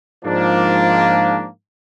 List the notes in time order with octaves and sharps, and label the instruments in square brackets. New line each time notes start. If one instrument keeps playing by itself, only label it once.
[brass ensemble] G#2 F3 A#3 D4